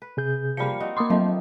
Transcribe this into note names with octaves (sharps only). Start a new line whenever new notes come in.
B4
C3 G#4 G6
F3 G3 A#3 B5 C#7
C4 D#4 F#4
A#3 B5 C6 D6 D#6
D#3 F3 F#3 A3